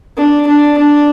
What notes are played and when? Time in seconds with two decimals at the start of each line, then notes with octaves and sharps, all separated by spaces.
0.17 D4
0.47 D4
0.78 D4